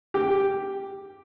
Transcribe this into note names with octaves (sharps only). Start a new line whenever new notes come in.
G4